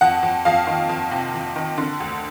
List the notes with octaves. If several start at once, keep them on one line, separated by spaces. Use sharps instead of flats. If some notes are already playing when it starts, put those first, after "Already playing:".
F2 F#5
F2
F2 F5
D#3
F2
C3
F2
D#3
D3
D2